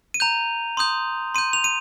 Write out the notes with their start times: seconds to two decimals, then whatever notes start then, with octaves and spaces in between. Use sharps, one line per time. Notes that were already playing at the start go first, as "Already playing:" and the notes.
0.14 D#7
0.20 A#5 G6 F7
0.77 C6 D#6 G6
1.34 C6 G6 D#7
1.53 F7
1.64 D#7